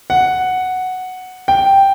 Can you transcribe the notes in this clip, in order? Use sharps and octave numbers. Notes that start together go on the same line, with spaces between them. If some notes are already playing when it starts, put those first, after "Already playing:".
F#5
G5